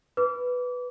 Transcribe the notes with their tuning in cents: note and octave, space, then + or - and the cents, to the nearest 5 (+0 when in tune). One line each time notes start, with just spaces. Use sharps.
B4 +0 D6 -30